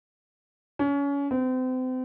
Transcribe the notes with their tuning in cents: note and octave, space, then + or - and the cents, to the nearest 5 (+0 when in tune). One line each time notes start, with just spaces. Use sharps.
C#4 +30
C4 -35